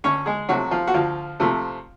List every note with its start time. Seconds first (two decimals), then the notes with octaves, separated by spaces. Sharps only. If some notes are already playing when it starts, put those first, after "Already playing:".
0.04 D2 C#4 C#5
0.26 G#3 G#4
0.49 C3 F3 F#3 A3 F#4
0.71 F3 F4
0.87 F#4
0.94 D2 F3 F4
1.40 C3 F3 A3